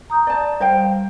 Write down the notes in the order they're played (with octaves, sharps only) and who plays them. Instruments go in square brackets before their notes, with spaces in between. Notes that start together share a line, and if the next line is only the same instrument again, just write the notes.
[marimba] A#5 D#6 G6
[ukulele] D5 A5
[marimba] G3 [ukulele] C5 F5 G5